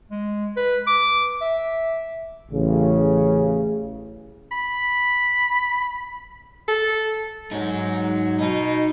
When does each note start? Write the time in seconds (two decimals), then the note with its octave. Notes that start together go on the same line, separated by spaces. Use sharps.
0.11 G#3
0.57 B4
0.87 D6
1.42 E5
2.50 A1 C#3
4.52 B5
6.68 A4
7.51 G#2 F#3 D#4
8.39 B2 D#4